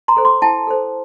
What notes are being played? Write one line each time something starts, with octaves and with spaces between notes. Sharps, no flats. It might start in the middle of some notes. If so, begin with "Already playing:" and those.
A#5 C6
A4 C5
C6 D6
E4 G5 A5
A4 C5